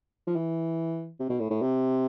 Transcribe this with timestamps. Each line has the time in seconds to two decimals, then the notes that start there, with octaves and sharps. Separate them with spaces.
0.27 F3
0.36 E3
1.20 C3
1.29 B2
1.40 A2
1.50 A2
1.62 C3